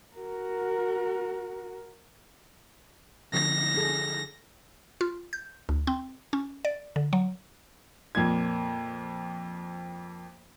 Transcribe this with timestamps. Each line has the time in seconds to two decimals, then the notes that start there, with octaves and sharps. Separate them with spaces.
0.17 F#4 A#4
3.34 D3 F3 A#6
3.77 G#4 A4
5.01 F4
5.33 G6
5.69 D2
5.87 C4
6.33 C#4
6.65 D5
6.96 D3
7.13 F#3
8.15 F2 A#2 G#6